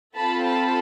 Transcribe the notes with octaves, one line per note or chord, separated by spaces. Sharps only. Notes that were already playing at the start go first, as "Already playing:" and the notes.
C4 F4 A4 A5 B5
A5 B5